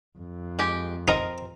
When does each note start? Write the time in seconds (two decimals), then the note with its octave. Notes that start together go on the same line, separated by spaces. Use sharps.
0.18 F2
0.59 G#3 G4 G#5
1.08 C4 D#4 A#4 A#5